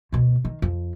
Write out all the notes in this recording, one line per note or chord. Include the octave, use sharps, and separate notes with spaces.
D2 B2
D#3
F2